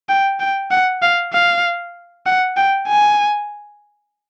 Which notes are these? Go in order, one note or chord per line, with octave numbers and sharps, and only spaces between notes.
G5
G5
F#5
F5
F5
F#5
G5
G#5